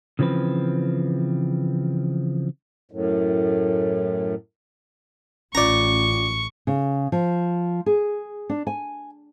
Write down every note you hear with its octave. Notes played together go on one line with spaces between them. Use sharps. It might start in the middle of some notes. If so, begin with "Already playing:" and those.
C#3 E3 F3 C4 B4
F#2 A2
A1 C#4 F4 D5 A#5 C#6
C#3
F3
G#4
D4
G#5